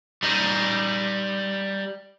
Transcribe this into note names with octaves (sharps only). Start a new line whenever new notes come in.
G3 D#4